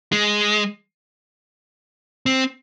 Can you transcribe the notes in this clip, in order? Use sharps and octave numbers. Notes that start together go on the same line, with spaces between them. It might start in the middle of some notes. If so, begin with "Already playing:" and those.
G#3
C4